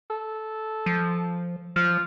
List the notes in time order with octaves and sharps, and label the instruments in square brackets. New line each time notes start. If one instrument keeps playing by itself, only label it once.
[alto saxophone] A4
[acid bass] F3
[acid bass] F3 [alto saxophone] F4